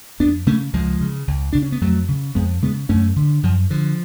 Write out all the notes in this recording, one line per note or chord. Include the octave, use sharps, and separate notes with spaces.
F2 B3 D4
C#3 A3 C#4
C#2 F3 G#3
C#3
C#2
C#3 D4
C#4
B3
F2 F#3 A3
C#3
F2 G#3 B3
C#3 G#3 B3
F#2 A3 C#4
D3
F#2 F3
D3 F3